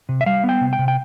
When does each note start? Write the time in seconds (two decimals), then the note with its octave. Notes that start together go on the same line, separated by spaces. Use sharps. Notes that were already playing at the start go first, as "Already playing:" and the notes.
0.09 C3
0.21 E5
0.26 G3 F5
0.44 B3
0.49 G5
0.61 C3
0.73 G5
0.79 C3
0.88 G5